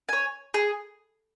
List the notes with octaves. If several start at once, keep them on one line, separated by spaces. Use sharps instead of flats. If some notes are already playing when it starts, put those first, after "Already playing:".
C#5 G#5
G#4